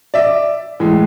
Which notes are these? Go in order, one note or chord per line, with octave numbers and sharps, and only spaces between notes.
D5 E5
A2 E3 G#3